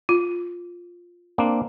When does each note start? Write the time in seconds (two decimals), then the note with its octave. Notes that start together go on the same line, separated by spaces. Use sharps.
0.09 F4
1.38 A#3 C4 D4